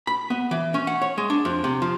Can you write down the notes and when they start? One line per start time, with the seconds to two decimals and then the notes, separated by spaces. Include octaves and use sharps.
0.07 B5
0.30 B3
0.51 E3
0.74 C#4
0.87 F#5
1.02 C#5
1.18 G#3
1.30 D4
1.45 F2
1.64 C3
1.82 F3